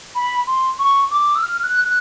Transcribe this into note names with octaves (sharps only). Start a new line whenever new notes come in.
B5
C6
C#6
D6
E6
F6
F#6
F#6